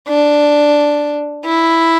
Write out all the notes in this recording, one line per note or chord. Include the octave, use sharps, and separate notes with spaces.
D4
E4